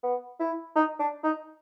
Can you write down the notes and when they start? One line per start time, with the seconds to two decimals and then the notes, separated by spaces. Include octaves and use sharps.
0.03 B3
0.40 E4
0.76 D#4
1.00 D4
1.24 D#4